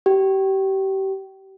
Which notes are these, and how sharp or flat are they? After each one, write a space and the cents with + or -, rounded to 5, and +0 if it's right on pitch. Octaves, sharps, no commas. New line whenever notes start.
G4 -30